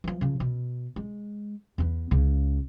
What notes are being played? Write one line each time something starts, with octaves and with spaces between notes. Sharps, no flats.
E3 F3
C#3 F3
B2
G#3
E2 B3
C#2 C#3